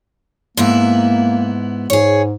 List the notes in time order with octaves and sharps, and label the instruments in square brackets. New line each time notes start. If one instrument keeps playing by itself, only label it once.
[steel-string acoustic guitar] G#2 B3 E4 [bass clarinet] A#3
[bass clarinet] G#2 [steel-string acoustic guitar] G#4 C#5